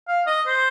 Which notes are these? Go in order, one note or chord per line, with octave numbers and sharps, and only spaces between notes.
F5
D#5
C5